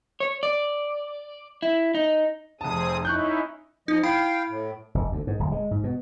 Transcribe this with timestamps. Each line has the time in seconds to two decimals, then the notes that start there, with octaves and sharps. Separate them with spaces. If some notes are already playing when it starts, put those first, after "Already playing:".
0.20 C#5
0.43 D5
1.62 E4
1.94 D#4
2.61 F1 C4 G#4 A5 D#6
3.05 C#4 D#4 E4 C#6 F#6 G6
3.88 F3 D#4 D#5
4.03 E4 F5 G5 B5 D7
4.49 A2
4.95 F1
5.12 D2
5.27 G#2
5.39 D1
5.52 G#3
5.71 G#2
5.84 B2